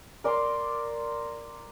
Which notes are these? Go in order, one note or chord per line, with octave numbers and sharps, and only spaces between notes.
A#4 D5 A#5 C6